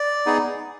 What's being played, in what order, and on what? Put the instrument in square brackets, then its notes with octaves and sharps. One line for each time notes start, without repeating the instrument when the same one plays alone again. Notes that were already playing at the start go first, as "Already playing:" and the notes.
Already playing: [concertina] D5
B3 D#4 G#4